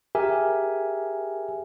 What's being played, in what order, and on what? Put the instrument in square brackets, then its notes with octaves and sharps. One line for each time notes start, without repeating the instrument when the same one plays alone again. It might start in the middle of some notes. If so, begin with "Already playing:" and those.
[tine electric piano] G4 G#4 A#4 E5 G#5